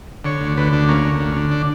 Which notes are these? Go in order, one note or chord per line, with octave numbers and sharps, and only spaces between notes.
D3 C#5
D2
D3 B4
D2 D4
A#3 C#4
D3
D2
C#4
D3
D4